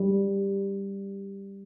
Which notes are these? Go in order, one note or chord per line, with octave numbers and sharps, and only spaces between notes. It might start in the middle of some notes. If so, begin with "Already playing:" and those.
Already playing: G3